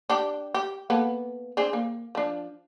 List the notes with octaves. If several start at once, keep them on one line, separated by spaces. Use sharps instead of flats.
D4 G4
G4
A#3 B3 A4
C4 D4 G#4
A#3
F3 D4